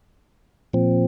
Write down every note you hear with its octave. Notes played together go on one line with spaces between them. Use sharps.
A#2 F3 C4